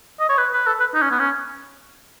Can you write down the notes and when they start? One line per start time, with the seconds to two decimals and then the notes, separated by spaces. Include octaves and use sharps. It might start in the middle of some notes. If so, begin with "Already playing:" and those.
0.20 D#5
0.29 C#5
0.38 B4
0.53 B4
0.67 A4
0.80 B4
0.94 D#4
1.02 C#4
1.11 B3
1.19 C#4